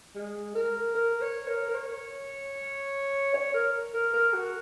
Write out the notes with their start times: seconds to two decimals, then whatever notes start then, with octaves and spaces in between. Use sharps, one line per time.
0.15 G#3
0.55 A#4
0.95 A#4
1.21 C#5
1.48 A#4
1.68 A#4
1.74 C#5
3.34 C#5
3.54 A#4
3.94 A#4
4.13 A#4
4.33 F#4